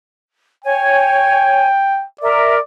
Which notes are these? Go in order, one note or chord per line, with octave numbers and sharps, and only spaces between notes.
C#5 G5 G#5
A#4 D5 E5